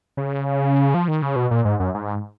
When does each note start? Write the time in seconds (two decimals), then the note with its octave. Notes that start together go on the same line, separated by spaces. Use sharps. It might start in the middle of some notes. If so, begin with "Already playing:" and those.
0.17 C#3
0.94 F3
1.08 D#3
1.22 C#3
1.36 B2
1.51 A#2
1.65 G#2
1.80 F#2
1.94 G#2